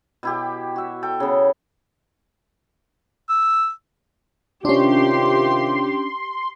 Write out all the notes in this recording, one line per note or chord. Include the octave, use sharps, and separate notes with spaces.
B2 E4 G4
F#4 E5
A4 G5
C#3 B3
E6
C3 D#3 C#4 D4 F4 G4 C6